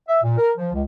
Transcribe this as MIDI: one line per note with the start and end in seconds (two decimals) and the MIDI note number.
0.08 0.18 76
0.23 0.34 46
0.38 0.51 70
0.57 0.72 53
0.73 0.82 37